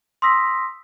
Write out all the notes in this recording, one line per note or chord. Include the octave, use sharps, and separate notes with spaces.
C6 D#6 E6 A#6 B6